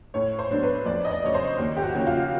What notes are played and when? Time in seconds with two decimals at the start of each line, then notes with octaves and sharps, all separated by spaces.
0.14 A2 C#5
0.39 C5
0.50 F#3 B3 D4
0.63 B4
0.86 F2 D5
1.05 D#5
1.11 D5
1.23 C#3 F#3 C#5
1.34 C5
1.58 D#2
1.77 G4
1.82 F#4
1.94 C#3 F3 A#3
2.07 F4